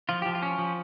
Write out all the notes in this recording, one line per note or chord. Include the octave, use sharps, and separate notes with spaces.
F3 F4
F3 G4
F4
C#4
F3